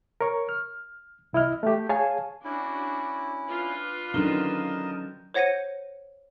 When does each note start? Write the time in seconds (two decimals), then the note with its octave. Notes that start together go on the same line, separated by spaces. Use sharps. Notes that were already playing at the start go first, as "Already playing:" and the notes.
0.21 A#4 C#5 C#6
0.49 F6
1.33 C2 E4 D#5 F6
1.63 A3 G4
1.89 G#4 C#5 F5 G#5 A5
2.44 C#4 D4 E4 F#4
3.47 D4 F4 B4
4.14 D3 D#3 F#3 C#4 A#4 D#5 A5 G7
5.34 C5 C#5 F#5 A#6 C#7 D#7